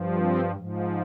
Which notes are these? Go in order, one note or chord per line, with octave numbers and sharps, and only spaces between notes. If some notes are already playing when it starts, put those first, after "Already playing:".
Already playing: G2 F3
C4
G#2 F3